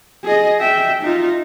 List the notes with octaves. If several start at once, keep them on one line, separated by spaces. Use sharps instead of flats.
G#4 D#5
E5 G5
D#4 F4